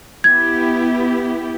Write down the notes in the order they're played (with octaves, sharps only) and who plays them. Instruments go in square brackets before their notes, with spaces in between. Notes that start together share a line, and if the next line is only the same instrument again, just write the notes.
[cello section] B3 E4 G4 [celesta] G#6